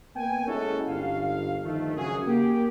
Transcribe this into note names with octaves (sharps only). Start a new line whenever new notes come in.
A#3 B3 G5 G#5
G#3 C#4 E4 F#4 A4
G1 F5
G1 D#3 F3 A3
F#2 C#3 F#4 G#4
A#3 G4